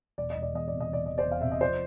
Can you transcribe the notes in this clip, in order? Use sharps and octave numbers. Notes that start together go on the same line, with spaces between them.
E1 D5
D#5
E1
D5
E2 D#5
C3 D5
D#5
E1 D5
E1 D#5
C5 D5
E2
F5
C3 E5
D#5
F3 C5 D5